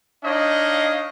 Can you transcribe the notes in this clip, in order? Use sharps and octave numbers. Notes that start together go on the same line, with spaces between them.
D4 D#4 C#5 D#5 F5